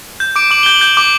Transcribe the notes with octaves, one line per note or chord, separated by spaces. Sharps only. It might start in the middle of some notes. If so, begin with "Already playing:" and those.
G6
D6 D7
D6 F#7
G6 G7
F#7
G6
D6